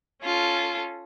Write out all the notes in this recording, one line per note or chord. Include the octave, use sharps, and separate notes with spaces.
C#4 F4 A4